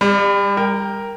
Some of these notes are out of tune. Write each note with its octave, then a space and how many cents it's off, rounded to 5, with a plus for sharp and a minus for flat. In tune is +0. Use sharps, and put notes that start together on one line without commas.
G3 +35 D5 +0
A#4 +0 G5 +0